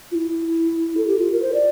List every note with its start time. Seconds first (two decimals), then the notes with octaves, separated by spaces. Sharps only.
0.12 F4
0.15 E4
0.97 A4
1.08 G4
1.19 F4
1.32 A#4
1.42 C5
1.54 D5